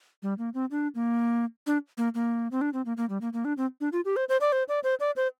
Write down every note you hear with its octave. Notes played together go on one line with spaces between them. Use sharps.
G3
A#3
C4
D4
A#3
D4
A#3
A#3
C4
D4
C4
A#3
A#3
G3
A#3
A#3
D4
C4
D4
F4
G4
C5
C5
D5
C5
D5
C5
D5
C5